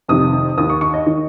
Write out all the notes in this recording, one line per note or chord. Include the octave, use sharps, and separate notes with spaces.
F2 C3 D#3 D#6
D#2 D#3 D#6
C#6
C#6
D#5
D#3 D#5